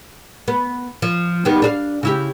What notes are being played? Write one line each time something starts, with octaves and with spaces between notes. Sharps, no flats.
B3
F3
D#3 G3 B3
D4 G#4 F5
C#3 E4 G4